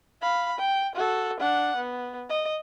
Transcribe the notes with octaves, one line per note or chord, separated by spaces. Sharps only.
F5 B5
G5
F#4 A4
D4 F#5
B3
D#5